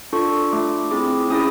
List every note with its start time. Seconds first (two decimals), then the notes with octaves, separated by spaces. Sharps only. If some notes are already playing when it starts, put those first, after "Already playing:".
0.13 D4 F4 A4 C#6
0.51 A3 D4 F4 D6
0.91 C4 E4 G#4 D6
1.30 C#4 E4 G#4 D#6